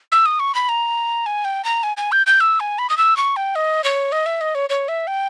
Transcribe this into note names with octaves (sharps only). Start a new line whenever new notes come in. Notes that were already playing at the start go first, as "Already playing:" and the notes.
E6
D#6
C#6
B5
A#5
G#5
G5
A#5
G#5
G#5
G6
G6
E6
G#5
B5
D#6
E6
C#6
G5
D#5
C#5
D#5
E5
D#5
C#5
C#5
E5
G5